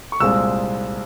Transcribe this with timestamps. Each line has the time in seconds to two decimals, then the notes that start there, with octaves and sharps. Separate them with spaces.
0.12 C#6
0.20 C2 A#2 G#3 C4 E6